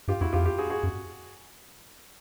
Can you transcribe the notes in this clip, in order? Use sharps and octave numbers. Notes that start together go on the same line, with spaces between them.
G2 F4 G4
F2 E4 F#4
F2 F4 G4
F4 G4
F#4 G#4
F#4 G#4
F#2